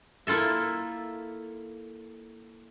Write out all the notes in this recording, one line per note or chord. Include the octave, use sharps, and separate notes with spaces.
A#3 E4 F4 A4 E5